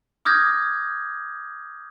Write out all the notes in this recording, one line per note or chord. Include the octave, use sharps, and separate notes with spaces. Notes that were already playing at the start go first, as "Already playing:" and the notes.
D6 D#6 F6 G6 G#6 A#6